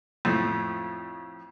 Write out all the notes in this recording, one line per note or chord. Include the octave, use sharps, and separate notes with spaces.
F2 A2